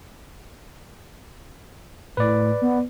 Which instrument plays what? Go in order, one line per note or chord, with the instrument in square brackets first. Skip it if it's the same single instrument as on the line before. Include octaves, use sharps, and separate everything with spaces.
[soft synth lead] A2 [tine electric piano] B4 D5
[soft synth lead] B3